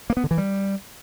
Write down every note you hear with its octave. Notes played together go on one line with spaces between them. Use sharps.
A#3
B3
D3
E3
G3